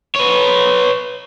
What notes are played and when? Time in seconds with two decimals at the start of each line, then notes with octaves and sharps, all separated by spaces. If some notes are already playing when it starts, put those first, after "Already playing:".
0.16 B4 C#5